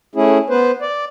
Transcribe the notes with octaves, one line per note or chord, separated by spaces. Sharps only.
A3 C#4 E4 G#4
B3 B4 C5
D5